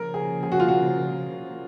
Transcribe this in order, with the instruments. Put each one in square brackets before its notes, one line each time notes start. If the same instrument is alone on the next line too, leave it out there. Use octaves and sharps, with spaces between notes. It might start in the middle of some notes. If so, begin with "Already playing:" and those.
Already playing: [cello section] C#3 F3 A#3 [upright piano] A#4
[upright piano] G#4
G#4
F#4
F4
F#4